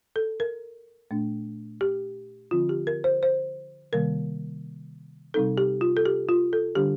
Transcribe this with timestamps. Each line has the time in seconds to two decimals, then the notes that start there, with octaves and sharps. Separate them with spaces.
0.16 A4
0.40 A#4
1.11 A#2 A3 D4
1.81 G4
2.51 D3 F3 C4 F4
2.69 G4
2.87 A#4
3.04 C5
3.23 C5
3.93 C3 D#3 G3 A#3 A#4
5.34 C3 G3 C4 D#4 A4
5.58 G4
5.81 F4
5.97 A4
6.06 G4
6.29 F4
6.53 A4
6.75 D3 G3 D4 G4